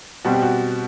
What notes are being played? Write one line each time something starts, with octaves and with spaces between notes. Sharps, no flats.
B2 G3 C4 F#4
G4
F#4